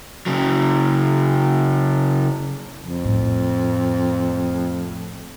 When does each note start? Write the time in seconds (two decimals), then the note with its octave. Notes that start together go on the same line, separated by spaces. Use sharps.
0.26 C#3 F#3
2.79 F2
3.05 A2